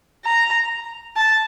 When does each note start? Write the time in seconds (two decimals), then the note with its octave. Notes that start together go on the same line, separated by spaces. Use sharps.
0.25 A#5
1.16 A5